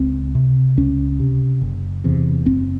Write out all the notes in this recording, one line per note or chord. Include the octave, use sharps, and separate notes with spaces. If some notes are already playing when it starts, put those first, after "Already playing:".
Already playing: C#2 C4
C3
C#2 C#4
C3
F#1
E2 C3
F#1 C4